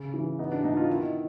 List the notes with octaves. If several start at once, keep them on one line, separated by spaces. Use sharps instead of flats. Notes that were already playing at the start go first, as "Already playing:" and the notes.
Already playing: C#3
E3
B3 D#4
D4
B2 D#4
F4
D#3 E4